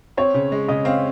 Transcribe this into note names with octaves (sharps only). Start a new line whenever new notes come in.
C4 C#5
C#3
G#3
C#3 D#5
C4 F5